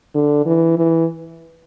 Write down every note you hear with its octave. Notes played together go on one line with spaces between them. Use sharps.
D3
E3
E3